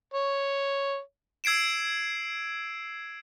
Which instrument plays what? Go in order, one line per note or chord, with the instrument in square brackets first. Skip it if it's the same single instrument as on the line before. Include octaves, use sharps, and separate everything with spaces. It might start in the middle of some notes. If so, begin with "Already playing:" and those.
[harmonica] C#5
[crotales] E6 G#6 C7 D7 E7